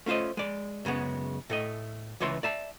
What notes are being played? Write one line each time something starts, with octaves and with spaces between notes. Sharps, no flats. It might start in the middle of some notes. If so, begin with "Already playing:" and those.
A3 C#4 F4 C5 D#5
G#3 D5
F#2 C#3 G#3 B3
A2 A3 D#5
C#2 E3 C#5 E5 C6
D5 E5 A5